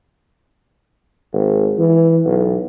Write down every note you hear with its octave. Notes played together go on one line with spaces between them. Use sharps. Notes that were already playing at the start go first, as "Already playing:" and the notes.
G#1
E3
B1